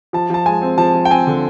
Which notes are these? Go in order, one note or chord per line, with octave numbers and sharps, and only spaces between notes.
F3 A5
F3 A5
G#3 G#5
C4
F3 A5
F3
G5
C4 G#5
D3